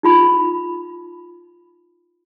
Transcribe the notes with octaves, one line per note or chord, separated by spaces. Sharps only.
D#4 F4 B5